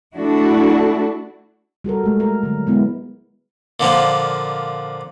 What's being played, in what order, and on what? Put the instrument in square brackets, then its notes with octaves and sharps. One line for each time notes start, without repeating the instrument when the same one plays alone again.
[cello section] A3 D4 E4 F#4 A4
[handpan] G3 F#4 A4 A#4
G#3 A3
A#4
D3 F#3 A#3
G#3 B3 E4
[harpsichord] A#2 D3 F3 A#3